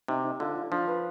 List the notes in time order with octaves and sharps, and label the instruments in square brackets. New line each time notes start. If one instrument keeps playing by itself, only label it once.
[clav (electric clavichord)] C3 [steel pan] D#4
[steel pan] D#4
[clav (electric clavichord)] D3 [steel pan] F4
[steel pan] F4
[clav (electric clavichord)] F3 [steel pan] D4
[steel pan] B4